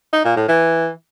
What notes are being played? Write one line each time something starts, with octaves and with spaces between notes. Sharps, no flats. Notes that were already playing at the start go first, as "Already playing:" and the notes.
D#4
A#2
A2
E3